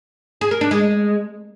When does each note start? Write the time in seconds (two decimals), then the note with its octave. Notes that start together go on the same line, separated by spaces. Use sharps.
0.41 G#4
0.51 A#4
0.61 D4
0.71 G#3